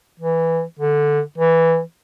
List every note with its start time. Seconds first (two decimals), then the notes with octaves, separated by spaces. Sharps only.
0.20 E3
0.79 D3
1.38 E3